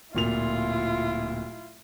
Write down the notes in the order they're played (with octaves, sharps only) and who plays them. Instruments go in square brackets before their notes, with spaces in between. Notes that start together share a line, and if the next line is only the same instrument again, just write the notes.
[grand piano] D1 A#2 F7 [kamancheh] E4 F4